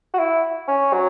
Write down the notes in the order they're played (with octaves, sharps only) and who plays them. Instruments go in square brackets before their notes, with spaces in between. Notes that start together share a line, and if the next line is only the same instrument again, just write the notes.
[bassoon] F#4
E4
C#4
F#3